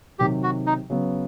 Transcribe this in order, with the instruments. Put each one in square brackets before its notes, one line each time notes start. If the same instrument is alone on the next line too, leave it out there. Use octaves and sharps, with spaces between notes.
[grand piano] C3 D#3 F#3 [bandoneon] G4
[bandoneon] F#4
D#4
[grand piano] C#3 F#3 B3